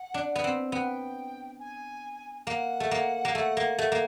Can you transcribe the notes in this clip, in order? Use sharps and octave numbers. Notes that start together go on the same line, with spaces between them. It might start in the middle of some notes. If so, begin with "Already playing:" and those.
Already playing: F#5
D4
B3
C4
B3 G5
G#5
A#3 F#5
A3
A#3
A#3
A3
A#3
A3
A#3